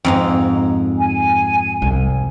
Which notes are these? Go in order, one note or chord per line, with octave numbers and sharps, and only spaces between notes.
F2 G#2 D#4
G#5
C2